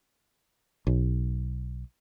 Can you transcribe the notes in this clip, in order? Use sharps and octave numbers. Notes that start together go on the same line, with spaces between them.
B1